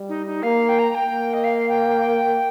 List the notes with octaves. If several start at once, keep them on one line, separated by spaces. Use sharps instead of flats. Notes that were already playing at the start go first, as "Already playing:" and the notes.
Already playing: G3
D#4
D#4
A#3 F5
G5
A#5
A#5
A#3 G5
D#5
F5
G5